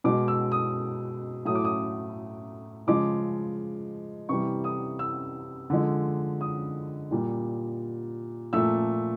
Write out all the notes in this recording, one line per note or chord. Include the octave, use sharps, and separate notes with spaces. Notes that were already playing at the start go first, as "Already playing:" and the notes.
B2 G#3 D6
E6
D#6
A2 F#3 A3 D#6
D6
D#6
C#3 F3 G#3 D6
C3 E3 G3 C#6
D#6
E6
D3 F3 G#3
D#6
A#2 G3
A#2 F3 A3 E6